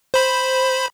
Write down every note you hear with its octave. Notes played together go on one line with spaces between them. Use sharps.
C5 B5